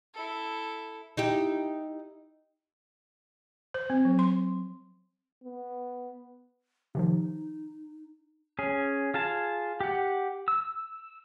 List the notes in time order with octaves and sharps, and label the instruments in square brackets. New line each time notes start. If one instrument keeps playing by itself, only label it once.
[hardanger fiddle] E4 A4
[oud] D#4 E4 G4
[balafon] C5
C4
F#3
C6
[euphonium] B3
[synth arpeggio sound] C3 D#3 F3 [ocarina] D#4
[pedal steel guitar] C#4 G#4
F4 G#4 A5
G4 F#5
E6